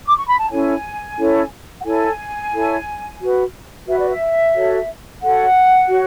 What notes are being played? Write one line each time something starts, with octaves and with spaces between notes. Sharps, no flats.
D6
C#6
B5
A5
C#4 E4 A4 C#5 G#5
C#4 E4 A4 C#5
F#5
E4 A4 C#5 G#5
E4 A4 C#5
F#4 B4
F#4 B4 E5
D5
E5
F#4 A4 C#5
F#4 A4 C#5 F#5
F#4 C#5